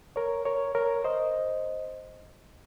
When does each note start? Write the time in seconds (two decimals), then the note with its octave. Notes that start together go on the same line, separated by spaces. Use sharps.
0.16 A#4 C#5
0.45 A#4 C#5
0.75 A#4 C#5
1.04 C5 D#5